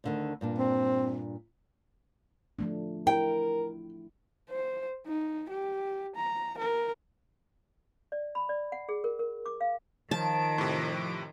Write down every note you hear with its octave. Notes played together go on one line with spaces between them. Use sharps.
D2 D3 D#3
G2 A#2 D4
C4
F3 A3 D4
E4 A#4 G5
C5
D#4
G4
A#5
A#4
D5
B5
D5
F#5
G#4
A#4
A#4
D6
F5
D#3 F3 A5 D7
A2 C3